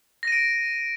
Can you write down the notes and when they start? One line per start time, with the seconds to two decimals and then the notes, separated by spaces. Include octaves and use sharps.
0.23 A#6
0.28 D#7
0.32 D7